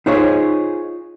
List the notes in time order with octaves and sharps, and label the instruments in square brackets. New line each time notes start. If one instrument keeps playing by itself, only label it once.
[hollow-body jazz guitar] D#4 F4 G#4 C5 C#5